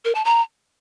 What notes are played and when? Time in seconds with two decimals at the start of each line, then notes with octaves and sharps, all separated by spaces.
0.05 A#4
0.15 A5
0.25 A#5